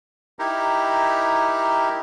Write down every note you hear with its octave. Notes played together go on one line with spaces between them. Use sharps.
D#4 E4 G4 A#4